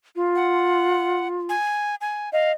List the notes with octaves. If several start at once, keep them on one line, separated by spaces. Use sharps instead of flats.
F4
F#5
G#5
G#5
D#5 F5